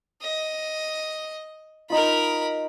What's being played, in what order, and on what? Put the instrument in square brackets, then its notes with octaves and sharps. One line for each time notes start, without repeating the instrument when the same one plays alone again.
[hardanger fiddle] D#5
[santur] D#4 F4 [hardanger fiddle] A#4 B5